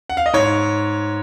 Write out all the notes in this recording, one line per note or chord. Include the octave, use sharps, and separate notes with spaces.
F#5
F5
D#5
G#2 C#5